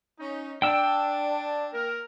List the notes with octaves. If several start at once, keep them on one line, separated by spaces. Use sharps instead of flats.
C#4 D#4
D4 G5 E6
A#3 A#4